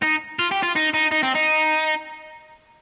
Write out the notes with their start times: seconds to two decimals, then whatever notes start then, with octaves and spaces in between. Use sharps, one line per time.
0.03 D#4
0.39 F4
0.51 G4
0.63 F4
0.76 D#4
0.94 D#4
1.11 D#4
1.23 C4
1.35 D#4